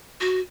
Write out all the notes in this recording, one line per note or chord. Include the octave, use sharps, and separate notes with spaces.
F#4